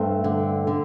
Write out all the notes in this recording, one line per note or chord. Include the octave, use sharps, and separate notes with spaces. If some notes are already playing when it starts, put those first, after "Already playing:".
Already playing: G2 A3 C4
D3
D3